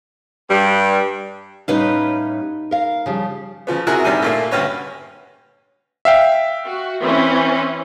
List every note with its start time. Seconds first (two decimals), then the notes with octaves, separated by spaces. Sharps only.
0.50 G2 G3
1.68 A2 G3 C#4 D#4 B4 F5
2.71 A#4 F5
3.06 C#3 F3 G3
3.67 C#3 F3 B3
3.87 C3 E4 F#4 G#4 A#4 F#6
4.04 G2 C3 D#3 G3 G#5
4.22 A#2 A3 A#3
4.51 D2 G2 C#4 B4 C#5
6.05 E5 F5 G5
6.64 F#4
7.01 E3 C4 C#4